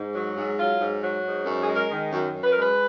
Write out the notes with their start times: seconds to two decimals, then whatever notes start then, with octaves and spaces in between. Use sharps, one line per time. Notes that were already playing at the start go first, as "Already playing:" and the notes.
Already playing: G#2
0.14 F#3
0.37 G#2
0.58 F#3 F4
0.80 G#2
1.03 F#3
1.24 G#2
1.46 F#2
1.61 G#4
1.68 G#3
1.75 A#4
1.90 D#3
2.11 F#2
2.34 F#2
2.43 B4
2.52 G#3 A#4
2.62 B4